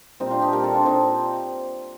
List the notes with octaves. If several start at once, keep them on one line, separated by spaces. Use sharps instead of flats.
A#2 G3 C4 D#4
D4 F4
D#4 G4
A#2 G3 G4 A#4
F4 A4
D4 F4
A#2 C4 D#4